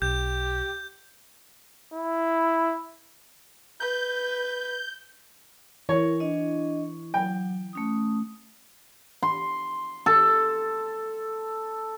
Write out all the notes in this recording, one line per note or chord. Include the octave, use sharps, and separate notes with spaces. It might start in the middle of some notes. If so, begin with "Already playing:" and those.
B1 G4 G6
E4
B4 G6
E3 A#4 C#5
D4 D#5
F#3 G5
A3 C#4 D#6
C6
A4